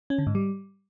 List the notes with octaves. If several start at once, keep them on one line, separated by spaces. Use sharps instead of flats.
C#4
D3
G#2
G3